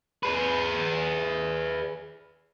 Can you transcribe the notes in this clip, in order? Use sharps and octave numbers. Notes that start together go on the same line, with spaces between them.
G#4 B4